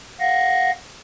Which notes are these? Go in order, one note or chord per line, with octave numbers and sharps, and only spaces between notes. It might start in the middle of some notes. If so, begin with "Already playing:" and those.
F5 F#5 A#6